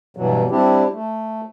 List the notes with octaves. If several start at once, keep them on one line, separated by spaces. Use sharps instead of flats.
G2 B2 E3 F#3
G3 C4 D4 E4 G4
A3